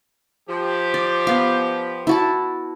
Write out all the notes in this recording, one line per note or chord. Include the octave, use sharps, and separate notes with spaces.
F3 G4
D5
B3 F5
E4 F#4 A5